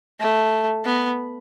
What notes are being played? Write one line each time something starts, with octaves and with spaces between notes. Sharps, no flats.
A3
B3